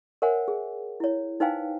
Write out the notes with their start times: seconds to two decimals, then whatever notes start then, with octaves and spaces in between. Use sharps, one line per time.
0.22 A#4 C5 C#5 E5 F#5 G#5
0.48 G#4
1.00 E4 C#5
1.40 D#4 B4 C5 F5 G5 G#5